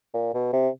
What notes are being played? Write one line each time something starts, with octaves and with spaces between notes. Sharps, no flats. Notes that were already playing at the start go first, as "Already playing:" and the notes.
A#2
B2
C3